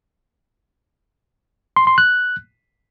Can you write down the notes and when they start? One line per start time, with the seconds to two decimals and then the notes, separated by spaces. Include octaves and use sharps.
1.76 C6
1.87 C6
1.98 F#6